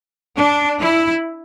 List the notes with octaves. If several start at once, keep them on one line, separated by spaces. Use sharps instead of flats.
D4
E4